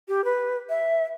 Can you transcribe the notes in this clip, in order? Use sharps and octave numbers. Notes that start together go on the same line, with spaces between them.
G4
B4
E5